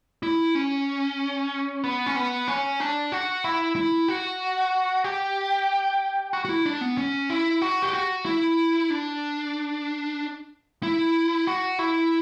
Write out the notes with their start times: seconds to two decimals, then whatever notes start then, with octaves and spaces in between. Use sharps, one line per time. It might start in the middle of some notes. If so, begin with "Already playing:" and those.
0.23 E4
0.55 C#4
1.84 B3
2.06 C#4
2.16 B3
2.48 C#4
2.80 D4
3.12 F#4
3.44 E4
3.76 E4
4.08 F#4
5.04 G4
6.33 F#4
6.45 F#4
6.49 E4
6.66 D4
6.81 B3
6.97 C#4
7.30 E4
7.62 F#4
7.82 G4
7.93 F#4
8.25 E4
8.90 D4
10.83 E4
11.47 F#4
11.79 E4